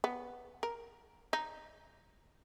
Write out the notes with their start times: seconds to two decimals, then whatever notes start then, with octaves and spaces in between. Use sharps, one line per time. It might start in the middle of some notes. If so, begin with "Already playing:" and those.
0.04 B3
0.63 A#4
1.33 D#4